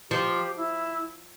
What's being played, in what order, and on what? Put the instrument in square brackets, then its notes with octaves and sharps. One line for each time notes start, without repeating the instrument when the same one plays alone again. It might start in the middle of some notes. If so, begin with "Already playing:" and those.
[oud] F3 [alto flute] G4
[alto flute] E4